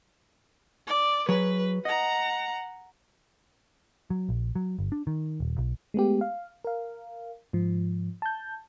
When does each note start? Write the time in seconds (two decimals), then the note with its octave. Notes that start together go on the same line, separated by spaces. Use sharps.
0.87 D5
1.29 F#3 G#4 B4
1.85 D#5 F#5 A#5
4.10 F#3
4.29 A#1
4.55 F#3
4.79 G1
4.92 D4
5.07 D#3
5.40 D#1
5.58 B1
5.94 G#3 A3 B3 G4
6.21 F5
6.64 A#4 F5
7.53 G#2 F3
8.22 A5 G6